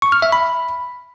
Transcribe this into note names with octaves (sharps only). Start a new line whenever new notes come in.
C#6
F6
E5
B5